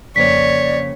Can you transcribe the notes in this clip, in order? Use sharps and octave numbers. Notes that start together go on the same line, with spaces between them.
F2 C#3 A#3 C#5 D5 B6